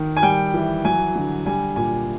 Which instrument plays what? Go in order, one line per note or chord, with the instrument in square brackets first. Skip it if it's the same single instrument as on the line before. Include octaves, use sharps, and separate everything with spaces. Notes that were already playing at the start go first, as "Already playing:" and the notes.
Already playing: [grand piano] D#3
G#5
G3 G5
E3
F#3 G#5
D3
G3 G#5
A#2 G#5